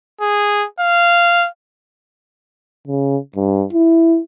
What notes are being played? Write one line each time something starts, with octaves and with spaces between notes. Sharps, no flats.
G#4
F5
C#3
G2
E4